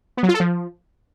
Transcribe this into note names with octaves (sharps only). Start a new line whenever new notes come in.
B3
F#3
F4
A4
F3